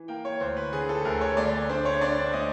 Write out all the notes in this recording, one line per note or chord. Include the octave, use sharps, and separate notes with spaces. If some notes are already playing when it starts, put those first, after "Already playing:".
Already playing: E3
A#3 G5
C#5
D2 C5
B4
D3 G#4
A4
D2 A#4
C#5
A3 D5
D4 C5
C#5
D4 D5
A3 D#5